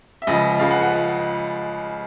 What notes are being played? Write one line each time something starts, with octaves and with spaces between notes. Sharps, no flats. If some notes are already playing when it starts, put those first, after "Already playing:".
E5
C#2 C#3 F3 D#5
C#2 C#3 F3 F5
F#5
F#5